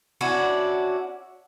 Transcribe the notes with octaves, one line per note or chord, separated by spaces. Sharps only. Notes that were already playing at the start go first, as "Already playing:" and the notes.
C#4 D4 E4 F#4